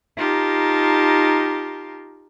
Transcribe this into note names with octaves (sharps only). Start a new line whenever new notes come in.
D#4 F4 G4 A#4 A5